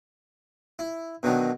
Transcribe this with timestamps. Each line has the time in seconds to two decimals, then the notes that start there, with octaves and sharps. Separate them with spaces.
0.79 E4
1.23 B2 D3 D#3 F#3